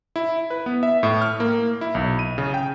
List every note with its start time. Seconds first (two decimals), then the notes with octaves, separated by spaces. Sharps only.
0.16 E4
0.50 B4
0.66 B3
0.83 E5
1.03 A2
1.22 F6
1.40 A#3
1.81 E4
1.95 B1
2.19 D#7
2.38 C#3
2.54 G5